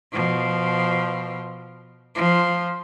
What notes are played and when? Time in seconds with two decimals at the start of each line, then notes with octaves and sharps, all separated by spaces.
0.13 B2 F3
2.15 F3